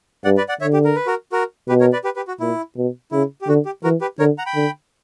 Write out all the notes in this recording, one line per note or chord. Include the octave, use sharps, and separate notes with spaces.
G2 D5 F#5
B4 D5
D5 F#5
D3 C#5 E5
G4
A#4
B4
F#4 A#4
F#4 A#4
B2 G4 B4
A#4 C#5
B4 D5
G4 B4
G4 B4
F#4
A#2 E4
B2
C#3 E4
G4
D3 F#4
G4
E3 F#4 A#4
G4 B4
D3 A#4 C#5
F#5 A#5
G5 B5
D3